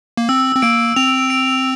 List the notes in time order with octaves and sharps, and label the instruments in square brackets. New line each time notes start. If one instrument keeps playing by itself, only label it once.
[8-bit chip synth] A#3
[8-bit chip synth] C4 [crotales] E6
[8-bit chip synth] C4
[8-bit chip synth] A#3 [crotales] D7
[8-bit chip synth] C4 [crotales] F7
[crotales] D7